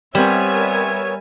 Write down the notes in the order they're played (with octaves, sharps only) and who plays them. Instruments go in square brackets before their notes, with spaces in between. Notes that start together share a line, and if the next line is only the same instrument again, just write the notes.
[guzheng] G3 [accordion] B3 C#5 [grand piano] C4 G4 [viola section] A#4 E5 G#5